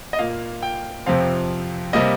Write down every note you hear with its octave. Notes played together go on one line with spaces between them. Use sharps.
D#5
A#2 A#3 F5
G5
F2 C3 F3 C4 F5
C3 G3 A#3 D#5